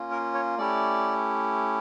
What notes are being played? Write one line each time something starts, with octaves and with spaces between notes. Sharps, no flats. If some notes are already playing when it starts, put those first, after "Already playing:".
Already playing: A#3 C#4 F4
A#4
C#5
A3 C#4 E4 G4 D5